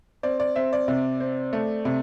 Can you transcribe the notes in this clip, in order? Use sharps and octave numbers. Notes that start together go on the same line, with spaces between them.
C4 D5
D5
C4 E5
D5
C3
C4
A3
C3